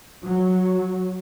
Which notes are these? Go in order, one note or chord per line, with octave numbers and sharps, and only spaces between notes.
F#3